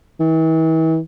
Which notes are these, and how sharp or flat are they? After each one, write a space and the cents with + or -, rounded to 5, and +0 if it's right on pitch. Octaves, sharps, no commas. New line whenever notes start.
E3 -40